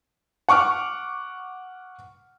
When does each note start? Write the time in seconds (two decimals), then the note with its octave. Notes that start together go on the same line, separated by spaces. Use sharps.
0.49 F#5 C#6 D6 F6